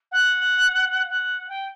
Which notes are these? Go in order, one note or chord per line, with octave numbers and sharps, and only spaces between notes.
F#5
F#5
G5